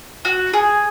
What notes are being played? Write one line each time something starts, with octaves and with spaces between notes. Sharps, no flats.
F#4
G#4